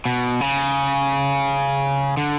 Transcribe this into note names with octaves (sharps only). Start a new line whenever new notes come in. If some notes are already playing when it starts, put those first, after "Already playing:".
B2
C#3
D3